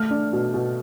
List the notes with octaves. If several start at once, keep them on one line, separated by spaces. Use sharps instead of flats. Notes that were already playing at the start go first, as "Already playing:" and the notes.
Already playing: A3 F6
D4
B2
B2